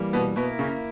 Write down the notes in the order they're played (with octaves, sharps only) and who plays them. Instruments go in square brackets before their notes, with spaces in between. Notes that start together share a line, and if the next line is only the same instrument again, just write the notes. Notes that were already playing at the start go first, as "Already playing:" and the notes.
Already playing: [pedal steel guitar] E3 G3 A#3
[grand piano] B2 B3
[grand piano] B2 B3 [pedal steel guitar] A#3 E4 A#4
[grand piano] C#3 C#4